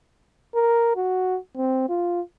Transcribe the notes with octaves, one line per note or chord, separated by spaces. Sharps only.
A#4
F#4
C4
F4